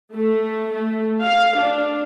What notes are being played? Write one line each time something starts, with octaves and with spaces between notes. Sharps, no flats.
A3
A3
F5
D4